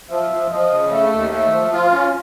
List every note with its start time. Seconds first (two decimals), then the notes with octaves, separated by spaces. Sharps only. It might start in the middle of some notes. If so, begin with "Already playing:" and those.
0.10 F3 E5
0.31 F3
0.51 F3 D#5
0.71 C#3
0.91 A3 E5
1.12 D#2
1.31 A3 E5
1.52 F3
1.73 F4 F5
1.93 C#4